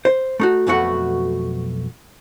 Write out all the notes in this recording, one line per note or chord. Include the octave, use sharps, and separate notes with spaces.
C5
A3 D#4 F#4
B1 F2 B2 A3 F#4 F#5